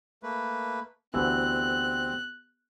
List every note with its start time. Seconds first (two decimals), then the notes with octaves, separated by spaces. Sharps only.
0.23 A3 A#3 B4
1.14 D2 E3 B3 C4 G4 E6 F#6